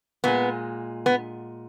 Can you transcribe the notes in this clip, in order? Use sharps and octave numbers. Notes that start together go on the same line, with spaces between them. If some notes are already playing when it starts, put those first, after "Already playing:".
A#2 G#3 B3
B3